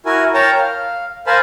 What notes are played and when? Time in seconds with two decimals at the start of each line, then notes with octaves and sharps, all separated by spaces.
0.06 E4 F#4 A#4 G#5
0.34 A#4 C#5 G5 A5 A#5
0.58 F5
1.27 A#4 C5 F5 G#5 A5 B5